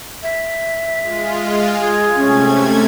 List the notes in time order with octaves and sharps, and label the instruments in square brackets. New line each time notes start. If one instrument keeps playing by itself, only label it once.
[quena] E5
[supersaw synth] G#3 F4
[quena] G#4
[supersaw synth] C3 A3 G#6 [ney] C#4